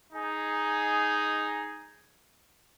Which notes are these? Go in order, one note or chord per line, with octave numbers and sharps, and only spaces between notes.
D#4 G#4